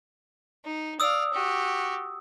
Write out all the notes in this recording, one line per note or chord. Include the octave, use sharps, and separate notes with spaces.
D#4
D5 F5 D#6 E6
F#4 G4